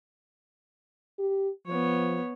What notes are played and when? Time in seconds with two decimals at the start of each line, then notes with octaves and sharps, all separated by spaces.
1.19 G4
1.67 F3 B3 C#5